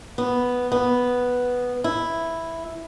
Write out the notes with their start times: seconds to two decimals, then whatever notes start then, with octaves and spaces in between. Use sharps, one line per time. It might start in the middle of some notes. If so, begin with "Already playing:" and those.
0.18 B3
0.72 B3
1.84 E4